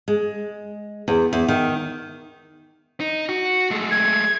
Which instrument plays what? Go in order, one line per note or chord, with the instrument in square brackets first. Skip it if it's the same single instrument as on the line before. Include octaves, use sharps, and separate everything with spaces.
[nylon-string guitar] G#3
E2
E2
D#3
[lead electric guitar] D#4
F#4
G#3 A3
[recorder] G#6